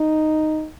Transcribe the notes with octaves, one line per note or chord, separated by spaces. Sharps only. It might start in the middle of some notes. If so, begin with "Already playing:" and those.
Already playing: D#4